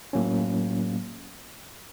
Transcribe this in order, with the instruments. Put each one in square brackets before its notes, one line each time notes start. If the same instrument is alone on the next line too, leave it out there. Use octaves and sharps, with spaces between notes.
[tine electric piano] A2 F#3 A#3 C#4